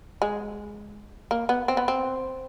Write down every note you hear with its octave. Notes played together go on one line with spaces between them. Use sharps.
G#3
A#3
B3
C4
B3
C4